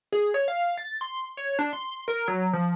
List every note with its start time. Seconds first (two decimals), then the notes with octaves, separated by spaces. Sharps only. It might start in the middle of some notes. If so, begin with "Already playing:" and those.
0.12 G#4
0.34 C#5
0.48 F5
0.78 A6
1.01 C6
1.37 C#5
1.59 D4
1.73 C6
2.08 A#4
2.28 F#3
2.53 F3